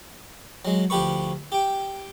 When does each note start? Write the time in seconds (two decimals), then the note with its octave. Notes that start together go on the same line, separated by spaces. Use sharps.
0.65 F#3 G#3
0.90 D2 F3 G4 B4 C#6
1.52 G4 G5